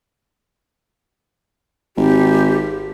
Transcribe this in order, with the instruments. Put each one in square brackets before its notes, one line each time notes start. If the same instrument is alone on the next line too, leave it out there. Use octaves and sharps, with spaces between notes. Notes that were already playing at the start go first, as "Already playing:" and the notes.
[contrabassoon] G#1 [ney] G4